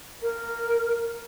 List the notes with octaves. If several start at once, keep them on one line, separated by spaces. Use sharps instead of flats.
A#4